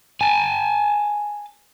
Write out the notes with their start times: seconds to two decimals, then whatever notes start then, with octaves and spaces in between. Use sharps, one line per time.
0.21 G#5 A5